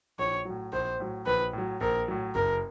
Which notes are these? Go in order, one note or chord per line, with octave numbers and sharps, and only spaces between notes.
A#1 C#5
A2 F#3
A#1 C5
A2 F#3
A#1 B4
A2 F#3
A#1 A#4
A2 F#3
F#1 A#4